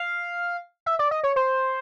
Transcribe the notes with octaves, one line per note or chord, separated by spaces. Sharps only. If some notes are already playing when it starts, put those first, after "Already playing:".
Already playing: F5
E5
D5
D#5
C#5
C5